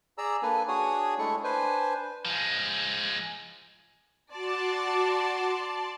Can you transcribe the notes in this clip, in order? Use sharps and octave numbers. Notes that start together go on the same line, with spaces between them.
G#4 D5 A#5 E6
A#3 D4 A4 B4 G#5
D4 F#4 G#4 C#5 D#6
G#3 A3 D4 E4 A4 C#6
D4 B4 C5 G#5
F3 G#3
F#4 D5 A5 C6